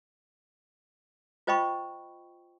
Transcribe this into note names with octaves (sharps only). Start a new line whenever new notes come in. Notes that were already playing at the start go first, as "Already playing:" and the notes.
F4 C5 D#5 G5 B5 C#6